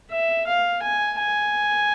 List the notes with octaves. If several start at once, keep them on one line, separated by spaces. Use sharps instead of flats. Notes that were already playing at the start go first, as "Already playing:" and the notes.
E5
F5
G#5
G#5